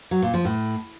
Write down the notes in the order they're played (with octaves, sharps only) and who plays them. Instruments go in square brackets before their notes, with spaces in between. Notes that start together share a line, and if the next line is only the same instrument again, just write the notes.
[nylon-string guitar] F#3
A#2
F3
A2